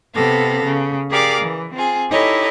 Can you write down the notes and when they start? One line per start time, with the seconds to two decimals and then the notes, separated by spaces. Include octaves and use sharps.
0.14 C3 B3 A4 F5 A#6
0.64 C#3
1.09 G4 G#4 A#4 D5 F5 D6
1.42 E3
1.74 C4 F4 G#4
2.10 D#4 E4 G4 A4 C#5 D#5